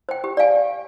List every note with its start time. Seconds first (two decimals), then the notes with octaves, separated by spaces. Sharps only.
0.09 C5 G5
0.24 G4
0.37 D5 F5 G#5